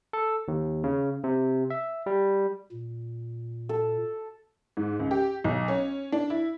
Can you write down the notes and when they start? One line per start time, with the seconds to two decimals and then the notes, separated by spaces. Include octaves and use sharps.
0.13 A4
0.48 D#2
0.84 C#3
1.24 C3
1.70 E5
2.06 G3
2.72 A#2
3.69 A4
4.77 G#2
5.00 C#2
5.11 G4
5.44 B1
5.68 C#4
6.12 D4
6.30 E4